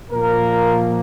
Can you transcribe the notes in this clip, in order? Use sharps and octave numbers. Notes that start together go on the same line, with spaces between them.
A#2 F3 A#3 A#4